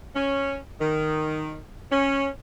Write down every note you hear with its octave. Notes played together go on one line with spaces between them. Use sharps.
C#4
D#3
C#4